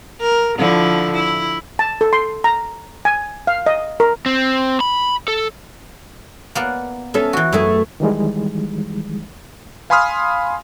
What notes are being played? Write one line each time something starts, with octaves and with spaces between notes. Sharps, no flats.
A#4
D3 F3 E4
E4
A5
A4
C6
A#5
G#5
F5
D#5
A#4
C4
B5
A4
A#3 B3 D5
B3 C#4 A4 E5
E3 F#4
F#2 A3 E4 G#4
D#3 E3 G3 G#3
F5 G#5 B5 C6 D#6 F6